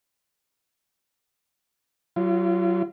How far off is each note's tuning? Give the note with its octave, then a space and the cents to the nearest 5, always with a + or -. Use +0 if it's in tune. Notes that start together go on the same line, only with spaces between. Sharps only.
F#3 +20 F4 -30